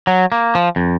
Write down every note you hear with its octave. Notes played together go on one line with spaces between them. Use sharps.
F#3
A#3
F3
F2